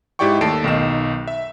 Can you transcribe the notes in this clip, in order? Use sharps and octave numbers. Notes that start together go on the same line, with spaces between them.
G#2 E4 G4 D5 G5 C#6
D#2 A3 A4 C7 D7
B1 D#3 D#4 E7
E5